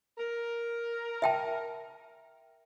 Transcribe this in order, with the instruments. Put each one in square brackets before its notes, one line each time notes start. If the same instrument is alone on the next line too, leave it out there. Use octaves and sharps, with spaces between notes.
[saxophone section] A#4
[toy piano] E5 G5 A5